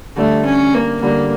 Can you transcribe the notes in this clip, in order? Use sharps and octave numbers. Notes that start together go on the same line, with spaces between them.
D3 G3 A3 D4
C#4
A#3
D3 G3 A#3 D4